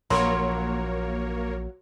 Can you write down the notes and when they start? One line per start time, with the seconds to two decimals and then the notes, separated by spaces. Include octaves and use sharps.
0.10 A#1 F#3 A#3 A#4 C#5 B5 C6